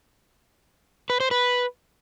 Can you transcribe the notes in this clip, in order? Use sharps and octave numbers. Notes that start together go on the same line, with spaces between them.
B4
C5
B4